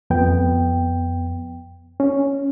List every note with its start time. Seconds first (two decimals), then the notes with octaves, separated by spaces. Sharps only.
0.10 F2 B3 G5
2.00 C#4